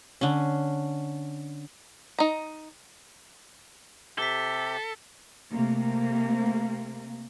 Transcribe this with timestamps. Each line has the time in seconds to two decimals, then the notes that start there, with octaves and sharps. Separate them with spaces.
0.21 D3 C#4
2.18 D#4 A#5
4.18 C3 G4 A4 B6 G7
5.54 C3 A3 A#3